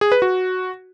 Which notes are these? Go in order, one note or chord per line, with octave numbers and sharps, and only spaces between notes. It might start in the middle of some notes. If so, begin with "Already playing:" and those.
G#4
B4
F#4